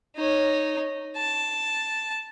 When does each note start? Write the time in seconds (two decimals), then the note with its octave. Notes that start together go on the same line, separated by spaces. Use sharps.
0.16 D#4 C#5
1.17 A5